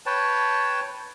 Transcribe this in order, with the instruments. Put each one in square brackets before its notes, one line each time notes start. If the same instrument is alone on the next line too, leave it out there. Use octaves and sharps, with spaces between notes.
[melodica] B4 C#5 G5 A5